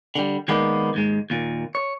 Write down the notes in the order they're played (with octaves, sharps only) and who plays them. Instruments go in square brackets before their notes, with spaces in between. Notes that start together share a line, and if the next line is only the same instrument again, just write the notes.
[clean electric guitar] D3 G3
D#3 G#3 A#3 B3 D#4 D5
D#2 G#2 G#3
D#2 A#2
C#5